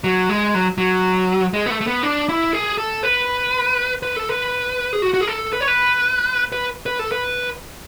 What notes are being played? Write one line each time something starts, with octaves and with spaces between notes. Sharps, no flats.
F#3
G#3
F#3
F#3
G#3
B3
A3
A3
B3
D4
E4
G#4
A4
B4
B4
A4
B4
G#4
F#4
F#4
G#4
A4
B4
C#5
B4
B4
B4
A4
B4